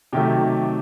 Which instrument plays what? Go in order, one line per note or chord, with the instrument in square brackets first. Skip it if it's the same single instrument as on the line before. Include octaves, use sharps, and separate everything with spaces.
[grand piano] C3 D#3 F#3 A3 G4